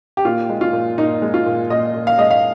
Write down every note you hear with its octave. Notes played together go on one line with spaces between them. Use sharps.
G4
A#2 F4
G#3
F4
A#2
A#2 D#4
G#3
F4
A#2
A#2 D#5
A#2
F5
G#3 D#5
F5